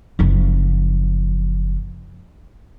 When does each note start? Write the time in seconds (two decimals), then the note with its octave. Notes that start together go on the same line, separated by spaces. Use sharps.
0.19 F#1 F3